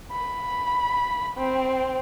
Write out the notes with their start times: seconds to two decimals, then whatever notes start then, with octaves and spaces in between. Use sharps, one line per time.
0.12 B5
1.37 C4